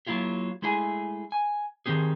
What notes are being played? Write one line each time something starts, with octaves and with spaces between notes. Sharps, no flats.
F#3 A#3 E4 F4 G4
G#3 A3 E4 G#4 G5 G#5
G#5
D#3 G3 C4 G4 G#4